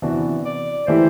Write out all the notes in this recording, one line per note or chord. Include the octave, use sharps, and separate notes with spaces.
C3 E3 B3 D4 F#4
D5
E3 A3 E4 G4 C5